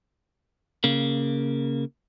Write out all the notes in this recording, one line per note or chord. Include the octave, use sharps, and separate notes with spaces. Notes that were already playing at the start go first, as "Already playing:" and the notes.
C#3 A#3